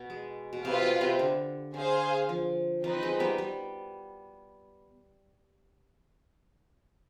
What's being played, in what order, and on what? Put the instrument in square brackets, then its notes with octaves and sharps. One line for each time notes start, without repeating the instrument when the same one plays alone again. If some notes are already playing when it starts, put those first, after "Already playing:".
Already playing: [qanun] B2 B3
G#3
B2
[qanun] C3 [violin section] F4 B4 F5
[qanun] B2
C3
D3
[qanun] D3 [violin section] G#4 C5 F5
[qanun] F3
[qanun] F3 [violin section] C4 D#4 B4
[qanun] G#3
G3 B3
G3